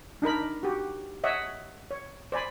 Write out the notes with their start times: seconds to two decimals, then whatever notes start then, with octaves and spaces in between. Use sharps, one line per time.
0.22 D4 D#4 A#4 B5
0.63 F#4 G4
1.24 C#5 D#5 E5 F#5
1.91 C#5
2.32 C5 D5 G#5 B5